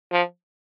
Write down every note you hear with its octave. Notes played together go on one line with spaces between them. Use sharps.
F3